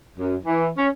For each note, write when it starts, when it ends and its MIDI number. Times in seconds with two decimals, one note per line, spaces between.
0.18 0.36 42
0.42 0.69 52
0.76 0.88 61